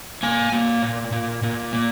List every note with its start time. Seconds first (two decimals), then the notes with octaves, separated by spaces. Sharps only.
0.23 A#3 G#5
0.52 A#3
0.82 A#2
1.12 A#2
1.43 A#2
1.73 A#3